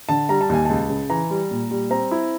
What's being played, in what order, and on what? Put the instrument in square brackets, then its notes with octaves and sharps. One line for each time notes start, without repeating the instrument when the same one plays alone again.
[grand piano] D3 A5
G3 A#5
A5
D#2 G#5
C#2 A5
C#3
E3 A#5
G3
A#2
G3
C4 A#5
E4